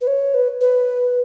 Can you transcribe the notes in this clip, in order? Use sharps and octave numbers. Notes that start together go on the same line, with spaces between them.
B4
C#5
B4
B4